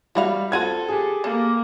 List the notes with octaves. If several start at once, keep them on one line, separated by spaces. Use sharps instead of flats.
G3 E4 F#4 F5
C4 F4 F#4 A4 G#6 D#7
G4 G#4
A#3 A4